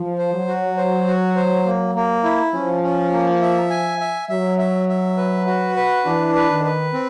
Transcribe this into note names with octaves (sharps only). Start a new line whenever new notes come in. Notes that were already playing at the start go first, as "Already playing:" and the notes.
Already playing: F3
C5
F#3
F#4
C5
F#4
C5
A#3
A#3
E4
F3 C#4
C#4
A#3
E5
G#5
E5
F#3 E5
E5
E5
B4
F#4
B4
E3 D4
B4
D#3
B4
C4